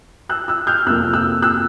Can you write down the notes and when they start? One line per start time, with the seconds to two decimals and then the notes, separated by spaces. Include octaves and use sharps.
0.29 E6 F#6
0.48 E6 F#6
0.67 F6 G6
0.86 F2 C3 F3 A#3 E6 F#6
1.13 E6 F#6
1.42 E6 F#6